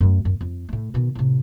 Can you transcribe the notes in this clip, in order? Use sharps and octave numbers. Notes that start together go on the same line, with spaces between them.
F#2 A3
F#2
F2
A2 A3
B2 D#3
A2 C3